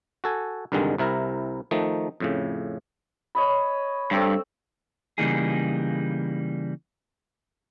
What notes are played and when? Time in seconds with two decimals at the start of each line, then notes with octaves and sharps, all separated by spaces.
0.24 F#4 A4 G#5
0.72 C2 G2 D3 D#3 G#3
0.98 C2 C3 E4 A#4
1.71 D#3 F3 A3 D#4
2.20 F2 A2 C#3
3.35 C#5 D#5 B5
4.11 G2 A3 C4 G5
5.18 C#3 E3 G3 A#3 D#4 G#4